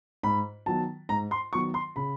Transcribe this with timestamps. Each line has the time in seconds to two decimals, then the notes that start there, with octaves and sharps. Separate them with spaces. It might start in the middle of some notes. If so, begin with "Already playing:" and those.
0.23 G#2 B5
0.66 D#3 F#3 B3 A5
1.09 G#2 A#5
1.31 C6
1.53 D#3 F#3 B3 C#6
1.74 C6
1.96 C#3 B5